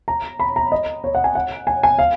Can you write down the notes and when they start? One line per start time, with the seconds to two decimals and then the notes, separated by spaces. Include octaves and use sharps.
0.08 A#5
0.40 B5
0.56 A#5
0.72 D#5
1.04 C#5
1.15 F#5
1.24 G#5
1.35 F#5
1.67 G#5
1.83 G#5
1.99 F5